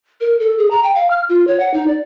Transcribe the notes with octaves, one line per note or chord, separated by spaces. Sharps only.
A#4
A4
G#4
A#5
G5
F5
F6
F4
C#5
F#5
D#4
D5